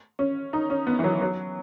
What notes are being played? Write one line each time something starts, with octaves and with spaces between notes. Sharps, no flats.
C#4
D#4
C#4
B3
E3
F#3
F#3